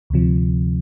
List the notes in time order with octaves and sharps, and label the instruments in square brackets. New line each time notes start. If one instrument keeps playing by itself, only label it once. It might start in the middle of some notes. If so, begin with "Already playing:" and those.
[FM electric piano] D2 C3 F3